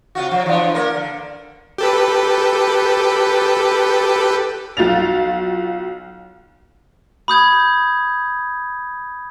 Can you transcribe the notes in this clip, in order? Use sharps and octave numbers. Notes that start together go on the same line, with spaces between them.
C3 F4 F#4
F3
E3 D4
A#3 A#4
D3
G4 A4 B4
B1 F4 F#4 A6 F7
B5 D#6 G6 G#6